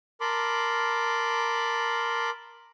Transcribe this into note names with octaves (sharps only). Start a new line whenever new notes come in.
A#4 A5 B5 C6 D6